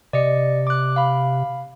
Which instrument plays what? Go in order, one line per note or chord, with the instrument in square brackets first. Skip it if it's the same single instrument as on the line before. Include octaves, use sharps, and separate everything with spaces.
[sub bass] C3 [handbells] D5 D#5 C#7
[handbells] D6 F#6
F5 B5